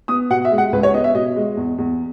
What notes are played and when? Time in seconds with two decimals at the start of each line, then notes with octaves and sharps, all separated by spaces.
0.08 B3 D#6
0.30 B2 F#5
0.45 E5
0.52 G#3
0.58 F#5
0.73 C#2 B4
0.83 C#5
0.94 B3 D#5
1.04 E5
1.14 B2 D#5
1.36 G#3
1.57 E2
1.78 E2